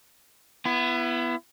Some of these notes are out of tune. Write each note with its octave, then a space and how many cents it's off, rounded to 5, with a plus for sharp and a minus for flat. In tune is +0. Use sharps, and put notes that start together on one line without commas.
B3 +0 E4 +30